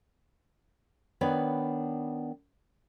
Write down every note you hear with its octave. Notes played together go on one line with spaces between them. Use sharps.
D#3 B3 D4 B4 C#5 D5